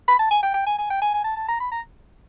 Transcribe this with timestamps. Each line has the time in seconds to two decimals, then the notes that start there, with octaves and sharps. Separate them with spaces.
0.08 B5
0.19 A5
0.31 G#5
0.43 G5
0.54 G5
0.66 G#5
0.78 G#5
0.90 G5
1.02 G#5
1.14 G#5
1.24 A5
1.36 A5
1.48 A#5
1.60 B5
1.72 A#5